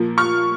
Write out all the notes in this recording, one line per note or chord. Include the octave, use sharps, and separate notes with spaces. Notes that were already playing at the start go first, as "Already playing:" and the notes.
Already playing: A#2 F3 A#3
C#6 F6